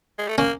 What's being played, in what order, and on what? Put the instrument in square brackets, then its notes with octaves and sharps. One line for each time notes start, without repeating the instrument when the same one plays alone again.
[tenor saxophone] G#3
A3
[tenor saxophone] A#3 [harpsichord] C#4